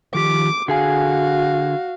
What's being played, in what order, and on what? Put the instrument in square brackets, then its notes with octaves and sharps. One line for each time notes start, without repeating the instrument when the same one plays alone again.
[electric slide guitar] D#3 F3 G4 [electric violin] D6
[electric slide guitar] D3 G#4 G#5 [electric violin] F#4 F5